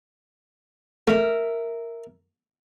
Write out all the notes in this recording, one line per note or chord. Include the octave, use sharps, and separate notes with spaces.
A3 A#4 E5